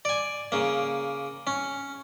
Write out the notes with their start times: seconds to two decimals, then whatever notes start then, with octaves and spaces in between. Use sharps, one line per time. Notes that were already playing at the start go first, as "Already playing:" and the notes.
0.05 D5 G#5
0.52 C#3 A#3
1.47 C#4